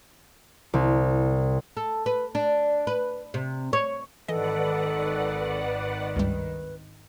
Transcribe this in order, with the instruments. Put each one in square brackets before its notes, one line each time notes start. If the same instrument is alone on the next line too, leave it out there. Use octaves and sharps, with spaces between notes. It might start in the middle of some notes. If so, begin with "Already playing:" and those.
[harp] C2
[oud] A4
B4
D4
B4
C3
C#5
[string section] G#1 D#3 [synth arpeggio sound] E3 D#5 [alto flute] A4 [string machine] B4 D5 F#5
[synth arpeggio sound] C#2 G2 G3 [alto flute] B4